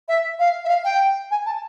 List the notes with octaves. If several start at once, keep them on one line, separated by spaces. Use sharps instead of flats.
E5
F5
E5
F5
G5
G#5
A5